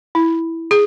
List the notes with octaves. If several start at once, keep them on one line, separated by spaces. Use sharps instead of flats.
E4
G#4